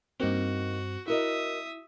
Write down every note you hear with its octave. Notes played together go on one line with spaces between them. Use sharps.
G2 A#3 C4 D#4 F#4
E4 F#4 A#4 D#5 E5 D#6